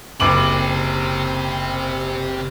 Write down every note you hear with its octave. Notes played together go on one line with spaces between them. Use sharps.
F#1 C3 C4 D6 F#7